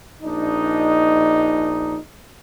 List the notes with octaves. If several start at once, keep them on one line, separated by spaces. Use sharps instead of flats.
A#1 D4 D#4